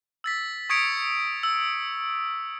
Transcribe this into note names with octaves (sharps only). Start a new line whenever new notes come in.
E6 A6 B6
C#6 D#6 G#6 B6 C#7 D7
E6